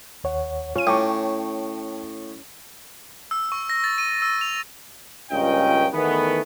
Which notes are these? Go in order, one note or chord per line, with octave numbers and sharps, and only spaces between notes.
D#2 C#5 F#5
C#4 F4 D#7
A2 G5 A5 C#6 D6
E6
C#6
A#6
A6
D#7
E6
F7
C#2 G2 A#2 C#4 D#5 G5
E2 D#3 E3 A3 B3